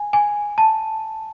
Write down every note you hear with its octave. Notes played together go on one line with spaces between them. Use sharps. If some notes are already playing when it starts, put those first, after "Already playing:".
Already playing: G#5
G#5
A5